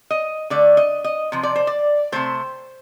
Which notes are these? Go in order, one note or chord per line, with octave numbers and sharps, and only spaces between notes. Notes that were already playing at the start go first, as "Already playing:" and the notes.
D#5
D3 A3 D5
D#5
D#5
C3 F3
D5
C5
D5
C3 F3 A3 C5